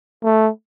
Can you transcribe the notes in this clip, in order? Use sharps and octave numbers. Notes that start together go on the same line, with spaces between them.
A3